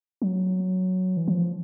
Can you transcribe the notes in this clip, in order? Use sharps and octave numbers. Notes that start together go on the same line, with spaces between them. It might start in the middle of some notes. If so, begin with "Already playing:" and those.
F#3
E3
F3